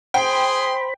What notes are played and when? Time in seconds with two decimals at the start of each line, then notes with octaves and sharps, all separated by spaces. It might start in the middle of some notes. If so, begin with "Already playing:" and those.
0.14 G#4 C5 G5 B5 C6